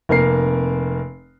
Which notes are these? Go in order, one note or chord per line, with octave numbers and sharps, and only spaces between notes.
F1 A#3 A#4 C7